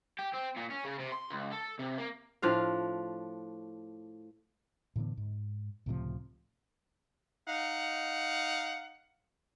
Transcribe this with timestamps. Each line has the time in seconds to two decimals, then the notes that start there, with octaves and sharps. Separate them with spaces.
0.19 G4
0.33 C4
0.56 A#2
0.70 C#4
0.84 C#3
0.99 C3
1.12 C6
1.30 C#2
1.52 A4
1.79 C3
1.98 A#3
2.42 A2 F3 D4 F5
4.96 A2 D3 E3 B3
5.17 G#2
5.86 C#2 A2 C3 F3
7.49 D#4 F5 F#5